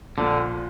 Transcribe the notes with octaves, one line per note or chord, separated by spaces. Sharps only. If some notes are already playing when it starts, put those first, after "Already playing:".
A#1 A#2 D3 A#3